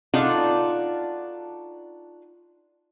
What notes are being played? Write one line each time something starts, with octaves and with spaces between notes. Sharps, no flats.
D4 D#4 F4 F#4 A4 D5